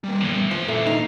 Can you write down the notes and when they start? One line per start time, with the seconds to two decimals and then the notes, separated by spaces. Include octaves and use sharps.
0.04 G3 A#3
0.21 E2 A2 E3 G3
0.51 F3 C5
0.68 A#2 D3 E3 A3 A#3
0.87 D#4 F5